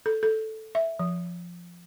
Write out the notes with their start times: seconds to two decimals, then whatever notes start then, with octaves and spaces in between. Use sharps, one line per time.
0.06 A4
0.23 A4
0.75 E5
0.99 F3